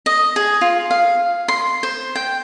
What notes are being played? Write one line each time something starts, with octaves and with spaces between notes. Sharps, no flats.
D#5
G#4
F4
F5
C6
C5
G5